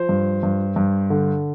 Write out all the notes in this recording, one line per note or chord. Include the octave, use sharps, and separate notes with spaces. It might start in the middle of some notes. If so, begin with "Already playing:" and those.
Already playing: F3 C5
G2
G2
G2
D3